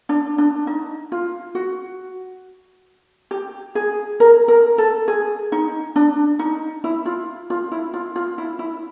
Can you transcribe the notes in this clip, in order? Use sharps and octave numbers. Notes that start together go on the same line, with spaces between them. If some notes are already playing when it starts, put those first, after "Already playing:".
D4
D4
D#4
F4
F#4
G4
G#4
A#4
A#4
A4
G#4
D#4
D4
D#4
E4
F4
F4
E4
F4
F4
E4
E4